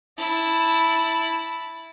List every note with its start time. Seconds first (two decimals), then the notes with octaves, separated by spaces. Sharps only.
0.18 E4 A5